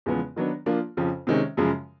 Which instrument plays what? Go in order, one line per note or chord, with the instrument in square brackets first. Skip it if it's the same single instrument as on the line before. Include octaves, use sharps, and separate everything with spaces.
[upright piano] E2 C#3 F3 G#3 B3
D#3 F#3 B3 D4
F3 A#3 D4 F4
F2 C#3 F3
C3 D#3 G#3 C#4
F#2 C#3 F3 G#3